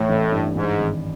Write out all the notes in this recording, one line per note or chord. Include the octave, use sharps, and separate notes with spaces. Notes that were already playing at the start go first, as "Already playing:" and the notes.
Already playing: A2 E3
A1
G2
G#2 E3
G#1